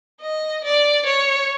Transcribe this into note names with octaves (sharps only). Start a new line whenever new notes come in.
D#5
D5
C#5